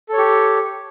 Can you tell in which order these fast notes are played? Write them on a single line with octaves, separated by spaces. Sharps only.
A4 C#5 G4